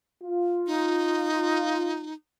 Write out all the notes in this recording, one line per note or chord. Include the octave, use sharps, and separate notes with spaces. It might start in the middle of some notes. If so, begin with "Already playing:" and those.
F4
D#4